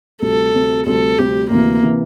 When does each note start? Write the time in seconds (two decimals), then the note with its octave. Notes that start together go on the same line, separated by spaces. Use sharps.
0.22 D2 C3 G3 C4 A4
0.54 D2 C3 G3 C4
0.86 D2 C3 G3 C4 A4
1.18 D2 C3 G3 C4 G4
1.50 D2 C3 E3 A#3
1.83 C3 E3